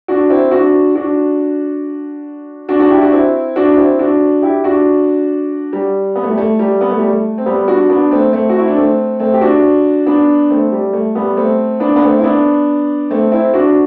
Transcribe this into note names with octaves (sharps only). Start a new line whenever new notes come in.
D4 F#4
C4 E4
D4 F#4
D4 F#4
D4 F#4
D4 F#4
E4 G4
D4 F#4
C4 E4
D4 F#4
C4 E4
D4 F#4
E4 G4
D4 F#4
G3
B3
A3
G3
A3
G3
B3
A3
G3
A3
C4
G3 B3
D4 F#4
B3 D4
A3 C4
A3 C4
F#4
E4
D4
A3 C4
A3 C4
G4
D4 F#4
B3 D4
A3 C4
G3
A3
G3 B3
A3 C4
B3 D4
B3
A3 C4
E4
B3 D4
A3 C4
C4 E4
D4 F#4